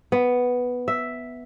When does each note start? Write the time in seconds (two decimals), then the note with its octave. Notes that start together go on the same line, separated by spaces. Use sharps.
0.12 B3
0.88 E5